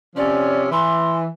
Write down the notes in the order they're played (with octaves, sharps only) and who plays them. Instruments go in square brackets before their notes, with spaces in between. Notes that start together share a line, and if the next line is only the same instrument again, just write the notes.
[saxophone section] C3 F3 C#4 [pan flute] D5
[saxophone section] E3 [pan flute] C6